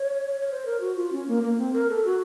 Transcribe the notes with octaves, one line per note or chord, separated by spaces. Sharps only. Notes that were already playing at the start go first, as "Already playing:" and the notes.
Already playing: C#5
C#5
C5
A#4
F#4
F4
C#4
A#3
A#3
C4
A#4
A4
F#4